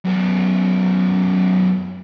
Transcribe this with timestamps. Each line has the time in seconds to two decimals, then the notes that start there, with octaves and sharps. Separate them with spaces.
0.04 F#2 B3